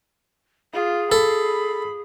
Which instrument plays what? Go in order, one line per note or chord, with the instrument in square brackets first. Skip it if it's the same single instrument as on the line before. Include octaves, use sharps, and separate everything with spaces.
[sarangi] F4 [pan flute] G#4
[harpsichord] A4 [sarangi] B5